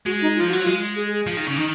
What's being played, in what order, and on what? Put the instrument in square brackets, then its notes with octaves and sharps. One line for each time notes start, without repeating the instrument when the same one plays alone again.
[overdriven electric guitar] G#3 [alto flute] F#4
[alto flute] D#4
[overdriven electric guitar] F3 [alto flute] F4
[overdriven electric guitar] F#3 [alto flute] F#4
[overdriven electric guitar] G#3 [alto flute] F4
[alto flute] G#4
G#4
[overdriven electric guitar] F3
D#3
C#3
[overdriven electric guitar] D#3 [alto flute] D#4